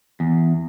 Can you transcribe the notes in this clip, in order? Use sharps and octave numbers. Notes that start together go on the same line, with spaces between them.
E2